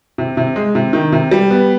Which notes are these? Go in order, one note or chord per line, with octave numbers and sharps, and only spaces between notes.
C3
C3
G#3
C3
D#3
C3
G3
B3